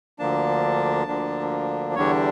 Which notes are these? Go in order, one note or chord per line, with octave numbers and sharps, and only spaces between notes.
D2 D3 F3 A#3 D4 A5
D2 D3 F3 A#3 D4
E2 D3 G3 D4 C#5